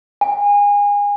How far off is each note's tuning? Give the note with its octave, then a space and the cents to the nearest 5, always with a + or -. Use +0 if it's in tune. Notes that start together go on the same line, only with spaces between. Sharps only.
G#5 -30